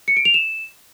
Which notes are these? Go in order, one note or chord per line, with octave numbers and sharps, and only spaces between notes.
C#7
D7
F7
E7